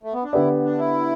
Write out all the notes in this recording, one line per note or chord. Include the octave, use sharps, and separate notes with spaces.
A3
B3
D4
D3 B3 E4 G4 D5
D4
E4